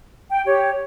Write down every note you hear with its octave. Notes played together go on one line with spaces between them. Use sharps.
G5
G4 C#5